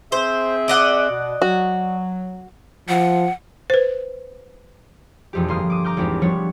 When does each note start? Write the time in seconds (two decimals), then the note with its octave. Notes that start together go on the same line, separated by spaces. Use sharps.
0.12 C4 G#4 C5 E5
0.68 D5 D#5 F#5
1.10 B2
1.42 F#3 F#4
2.89 F3 F#5
3.70 B4 C5
5.33 E1 F2 G4
5.48 G1 A#3 C6 D#6 F6
5.70 D6 D#6
5.84 A#5 D6 F6 G6
5.97 G#1 E2 C4 G4
6.22 F3 G3 B3 D4 C#5